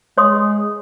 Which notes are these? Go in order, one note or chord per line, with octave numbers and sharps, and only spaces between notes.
G#3 C#5 C6 D#6